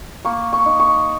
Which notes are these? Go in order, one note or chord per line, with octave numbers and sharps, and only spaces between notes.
A#3 C#6
C#6
D#4
C#6